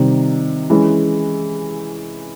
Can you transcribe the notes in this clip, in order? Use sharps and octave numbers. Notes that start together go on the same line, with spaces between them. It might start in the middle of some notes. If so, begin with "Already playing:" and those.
Already playing: C3 D#3 G3
E3 G#3 C#4